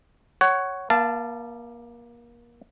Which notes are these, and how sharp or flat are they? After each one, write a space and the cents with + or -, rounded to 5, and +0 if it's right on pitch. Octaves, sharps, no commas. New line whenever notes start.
C#5 +0 F#5 +20
A#3 +30 F5 -30 A5 +0